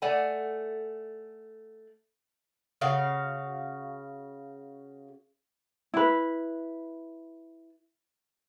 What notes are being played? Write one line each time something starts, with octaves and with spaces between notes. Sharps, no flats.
A3 D5 F#5 G#5
C#3 F#4 F5
E4 B4